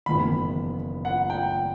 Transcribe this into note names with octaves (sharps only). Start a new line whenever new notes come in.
F#1 E2 D#3 B5
F#5
G5